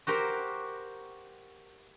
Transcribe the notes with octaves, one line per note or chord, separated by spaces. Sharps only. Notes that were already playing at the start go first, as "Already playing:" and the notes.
F#4 G4 A#4 C5